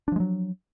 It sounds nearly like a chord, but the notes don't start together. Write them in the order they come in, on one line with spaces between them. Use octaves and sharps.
D4 F3 G#3 F#3